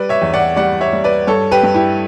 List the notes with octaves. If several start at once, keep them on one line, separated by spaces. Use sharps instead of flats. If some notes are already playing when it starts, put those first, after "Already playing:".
Already playing: G3 B4 D5
C#5 E5
E2
D5 F#5
G3 D5 F#5
C#5 E5
G3
B4 D5
G2 A4 C#5
G4 B4
G2
E4 G4